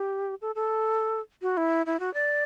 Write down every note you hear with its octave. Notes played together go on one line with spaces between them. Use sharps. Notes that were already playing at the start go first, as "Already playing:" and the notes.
Already playing: G4
A4
A4
F#4
E4
E4
F#4
D5